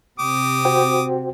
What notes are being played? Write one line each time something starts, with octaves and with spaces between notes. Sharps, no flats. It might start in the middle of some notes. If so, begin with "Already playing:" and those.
C3 G4 D6 D#6
F#4 C5 G5